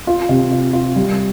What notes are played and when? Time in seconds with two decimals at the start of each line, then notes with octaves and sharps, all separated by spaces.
0.07 F4
0.29 C3
0.51 F4
0.73 F4
0.96 G3